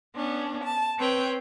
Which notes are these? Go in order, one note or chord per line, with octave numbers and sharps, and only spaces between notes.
B3 C#4 D4
A5
C4 B4 C#5 G5